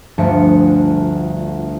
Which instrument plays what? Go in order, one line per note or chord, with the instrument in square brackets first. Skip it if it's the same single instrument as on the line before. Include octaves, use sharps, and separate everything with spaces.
[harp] G1 D2 G2 F3 A3 C#7